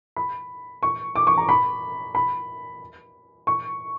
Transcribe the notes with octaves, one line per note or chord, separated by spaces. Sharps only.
B5
C#6
D6
C#6
A#5
B5
B5
C#6